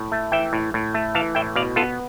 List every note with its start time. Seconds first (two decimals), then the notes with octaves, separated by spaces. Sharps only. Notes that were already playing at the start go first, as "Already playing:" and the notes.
Already playing: A2
0.12 A3
0.32 E3 E5 G5
0.53 A2
0.74 A2
0.94 A3
1.15 E3 F5 A5
1.35 A2 E5 G5
1.56 B2 D5 F5
1.76 B3 F4 A4